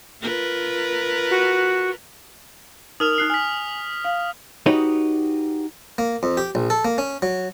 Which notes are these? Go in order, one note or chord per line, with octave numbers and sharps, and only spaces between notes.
F4 A#4 B4
F#4
D#4 A#4 D#6 F6 F7
D#4 F#6 C7
G#5 F6 B6
F5
D#4 F#4 G4 B4 C#5 D#5
A#3
F2
G4
A#1
A4
A#3
C#4
F#3